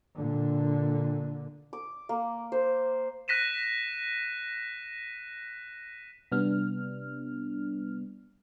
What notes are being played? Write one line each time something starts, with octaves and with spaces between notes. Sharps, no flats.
A#2 D3
D6
A#3
C5
F#6 A#6 B6 D#7 E7
C3 G3 B3 D4 F6